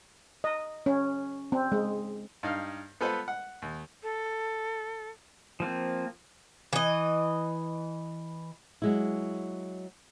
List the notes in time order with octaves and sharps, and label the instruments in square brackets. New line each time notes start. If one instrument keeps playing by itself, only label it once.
[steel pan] D#5
C#4
C4
G#3
[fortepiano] G2 D#4 F5
B3 F4 A4 B4 C5
F#5
D#2
[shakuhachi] A4
[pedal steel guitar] F3 A#3 C4
[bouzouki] E3 D#5
[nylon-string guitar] F#3 G#3 E4